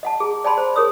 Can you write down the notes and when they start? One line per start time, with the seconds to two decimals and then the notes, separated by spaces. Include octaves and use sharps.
0.03 D#5 F#5 A5
0.20 G#4 A#5
0.44 D5 G5 A5 B5 C6
0.58 C5
0.76 G#4 A#4 C#5 D#6 E6